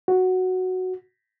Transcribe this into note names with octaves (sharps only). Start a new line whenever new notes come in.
F#4